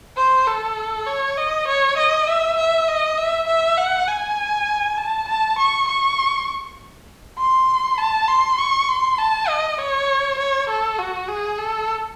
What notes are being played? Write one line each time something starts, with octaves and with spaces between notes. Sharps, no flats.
C5
A4
C#5
D#5
C#5
D#5
E5
E5
D#5
E5
E5
F#5
G#5
A5
A5
C#6
C#6
C6
A5
C6
C#6
C6
A5
D#5
C#5
C#5
A4
F#4
G#4
A4